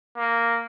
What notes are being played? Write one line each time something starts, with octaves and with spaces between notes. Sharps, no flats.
A#3